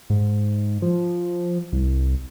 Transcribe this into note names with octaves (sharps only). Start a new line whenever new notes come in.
G#2
F3
C2